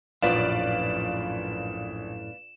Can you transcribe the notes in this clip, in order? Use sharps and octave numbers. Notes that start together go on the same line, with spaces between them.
A#1 F#2 A2 F3 B4 D5 F5 E7